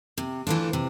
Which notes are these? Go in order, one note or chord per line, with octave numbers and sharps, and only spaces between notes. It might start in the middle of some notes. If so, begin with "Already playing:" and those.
C3
E3 A3 D4 F4
C3